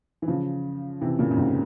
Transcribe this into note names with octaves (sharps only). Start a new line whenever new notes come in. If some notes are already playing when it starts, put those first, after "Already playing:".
E3
C#3 F3
C3 E3
A#2 C#3
C#3
G#2 C3